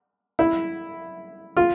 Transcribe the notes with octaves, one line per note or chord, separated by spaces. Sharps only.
E4
F4